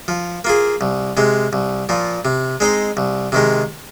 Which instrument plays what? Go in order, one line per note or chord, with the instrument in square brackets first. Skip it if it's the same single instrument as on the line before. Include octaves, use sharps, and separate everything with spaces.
[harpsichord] F3
A#3 F4 G#4
C2
C3 G#3
C2
A#2 F3
C3
G#3 C4 D#4 C5
C2
C3 D#3 G#3